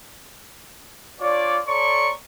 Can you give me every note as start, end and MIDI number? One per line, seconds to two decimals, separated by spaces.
1.21 1.60 62
1.21 1.60 65
1.21 1.60 73
1.21 1.60 74
1.66 2.12 69
1.66 2.12 73
1.66 2.12 74
1.66 2.12 82
1.66 2.12 84
1.66 2.12 85